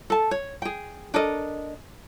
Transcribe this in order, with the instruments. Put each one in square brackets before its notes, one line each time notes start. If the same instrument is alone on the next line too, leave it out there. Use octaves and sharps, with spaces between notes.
[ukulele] A4 A5
C#5
G#4 G5
D4 A4 A#4 D#5